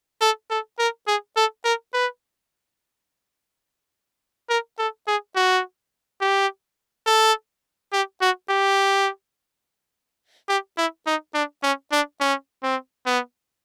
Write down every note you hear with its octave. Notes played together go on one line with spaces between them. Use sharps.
A4
A4
A#4
G#4
A4
A#4
B4
A#4
A4
G#4
F#4
G4
A4
G4
F#4
G4
G4
E4
D#4
D4
C#4
D4
C#4
C4
B3